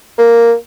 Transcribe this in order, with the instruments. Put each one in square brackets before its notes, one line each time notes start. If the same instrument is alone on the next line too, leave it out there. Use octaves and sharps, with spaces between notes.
[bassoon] A#3